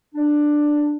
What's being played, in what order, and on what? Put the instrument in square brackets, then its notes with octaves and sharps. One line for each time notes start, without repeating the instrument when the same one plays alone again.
[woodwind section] D4